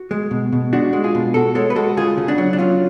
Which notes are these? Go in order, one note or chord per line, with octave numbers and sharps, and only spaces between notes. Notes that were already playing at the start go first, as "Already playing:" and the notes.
Already playing: F#4
G#3
B2
B2
G#3 D4 F#4
G#3
F4 G#4
B2
B2 F#4 A4
G#3 A4 C#5
B4
G#3 F#4 A4
C#3 F4 G#4
C#3
D4 F#4
F#3
D4
F#3 C#4 F4